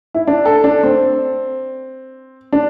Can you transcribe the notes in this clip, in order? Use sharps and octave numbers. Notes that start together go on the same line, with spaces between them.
E4
D4
A4
D4
C4
D4